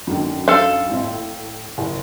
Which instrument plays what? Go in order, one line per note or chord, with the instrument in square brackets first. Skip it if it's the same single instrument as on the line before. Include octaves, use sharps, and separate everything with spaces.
[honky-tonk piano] F#2 D3 D#3
[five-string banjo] A4 F5
[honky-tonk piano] A1 C4 E4
A2
F#1